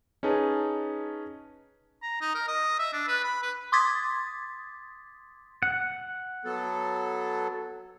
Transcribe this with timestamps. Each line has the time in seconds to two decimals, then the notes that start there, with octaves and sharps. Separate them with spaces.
0.23 C#4 D#4 G#4 B4 A5
2.02 A#5
2.21 D#4
2.35 A#4
2.48 D#5
2.79 E5
2.93 D4
3.08 B4
3.24 B5
3.43 B4
3.72 C6 D6 D#6 G#6 A6 B6
5.63 F#5
6.45 F#3 B3 A4